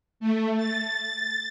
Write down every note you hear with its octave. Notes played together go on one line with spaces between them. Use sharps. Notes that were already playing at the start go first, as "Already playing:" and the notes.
A3
A6